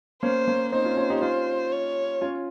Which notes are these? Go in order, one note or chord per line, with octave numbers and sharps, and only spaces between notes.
A#3 C#4 C5
A#3 C#4
C4 D#4 C5
C#4 F4
C#4 F4
D#4 G4
C#4 F4 C5
C#5
C#4 F4